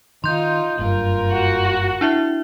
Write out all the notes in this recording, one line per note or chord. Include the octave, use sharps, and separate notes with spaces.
D#3 D#4 F4 C6 G6
F#1 G2 F4 A#4
F#4
D4 E4 E5